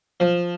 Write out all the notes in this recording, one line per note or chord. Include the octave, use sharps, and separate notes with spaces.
F3